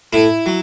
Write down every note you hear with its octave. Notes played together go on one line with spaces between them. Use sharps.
A2 E4
F#3